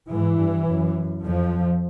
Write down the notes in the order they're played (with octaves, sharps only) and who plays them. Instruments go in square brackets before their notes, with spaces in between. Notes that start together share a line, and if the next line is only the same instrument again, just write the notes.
[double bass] G#2 [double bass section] E3
[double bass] G2
F#2
[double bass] F2 [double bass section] F3